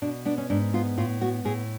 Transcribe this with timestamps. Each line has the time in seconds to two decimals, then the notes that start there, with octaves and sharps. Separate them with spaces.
0.02 B2 D4
0.25 B3 D4
0.38 C#4
0.50 G#2 D4
0.74 B3 F4
0.98 A2 F4
1.21 B3 F#4
1.45 A2 G#4